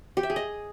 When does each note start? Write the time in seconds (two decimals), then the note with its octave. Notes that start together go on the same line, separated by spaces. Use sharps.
0.17 G4
0.23 E5
0.30 G#4
0.36 D#5